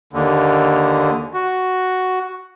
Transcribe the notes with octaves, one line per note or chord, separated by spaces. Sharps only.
D#2 D3
F#4